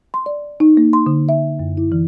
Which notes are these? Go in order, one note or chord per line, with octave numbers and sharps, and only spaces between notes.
C6
D5
D#4
A#3
C6
D3
E5
F#2
E4
E3